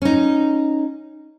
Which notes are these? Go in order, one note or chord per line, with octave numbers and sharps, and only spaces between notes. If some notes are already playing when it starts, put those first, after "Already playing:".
C#4 D#4